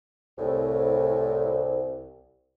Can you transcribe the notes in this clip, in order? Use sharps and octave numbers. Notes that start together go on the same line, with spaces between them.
C2 A2